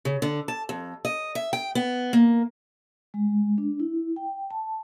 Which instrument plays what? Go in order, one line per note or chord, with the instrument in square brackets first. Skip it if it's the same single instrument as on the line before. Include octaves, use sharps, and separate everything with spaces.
[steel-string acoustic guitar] C#3
D3
A5
F2
D#5
E5
G5
B3
A#3
[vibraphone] G#3
D4
E4
G5
A5